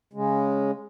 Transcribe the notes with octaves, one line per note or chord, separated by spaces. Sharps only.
C#3 G#3